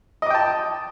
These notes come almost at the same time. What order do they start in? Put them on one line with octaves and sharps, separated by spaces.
D#5 D6 G5 A5